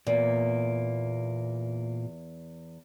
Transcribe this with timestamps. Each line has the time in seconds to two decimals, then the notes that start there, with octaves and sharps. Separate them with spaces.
0.07 E2 A#2 A#3